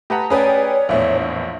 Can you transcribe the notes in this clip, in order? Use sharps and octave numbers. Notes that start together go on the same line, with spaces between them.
A3 G4 B4 F#5 A5 A#5
C#4 G#4 B4 C#5 D5 G5 D#6
A#1 E2 A2 E3 E5